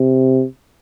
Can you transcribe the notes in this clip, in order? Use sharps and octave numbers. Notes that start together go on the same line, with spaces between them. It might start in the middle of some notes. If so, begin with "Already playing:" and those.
Already playing: C3